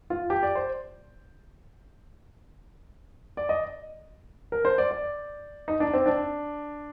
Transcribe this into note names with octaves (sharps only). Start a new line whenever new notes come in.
F4
G4
D5
C5
D5
D#5
A#4
C5
D5
D5
D#4
D4
C4
D4